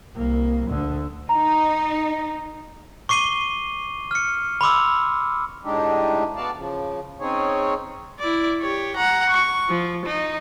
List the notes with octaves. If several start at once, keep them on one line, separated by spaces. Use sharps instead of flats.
C2 A#3
D2 D3
D#4 A#5
C#6 D6 C7 D#7 G7
F6 C#7
B5 C6 D6 E6
A2 G#3 D4 D#4 G4
B3 F#4 D5 F5 A5
C#3 F3
C4 C#4 D#4 G#4 C#5
E4 D5
G4 C#5
F#5 A#5
C#6
F3
D#4